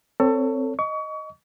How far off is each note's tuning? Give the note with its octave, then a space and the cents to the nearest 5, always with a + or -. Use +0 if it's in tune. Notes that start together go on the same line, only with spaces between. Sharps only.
C4 +0 A4 +25 C#5 +15
D#5 +0 C#6 +30